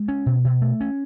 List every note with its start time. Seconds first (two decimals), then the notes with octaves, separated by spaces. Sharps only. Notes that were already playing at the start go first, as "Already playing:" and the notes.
Already playing: G#3
0.08 C#4
0.26 B2
0.45 B2
0.62 A3
0.80 C#4